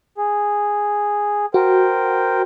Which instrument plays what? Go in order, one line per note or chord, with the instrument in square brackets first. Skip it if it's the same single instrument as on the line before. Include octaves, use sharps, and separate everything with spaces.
[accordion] G#4
[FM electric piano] F#4 [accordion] A#4 C5 G5